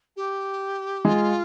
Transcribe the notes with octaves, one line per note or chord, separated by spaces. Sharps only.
G4
G#3 F4